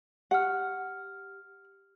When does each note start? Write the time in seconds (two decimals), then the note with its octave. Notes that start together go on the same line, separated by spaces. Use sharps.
0.31 G4 F#5 F6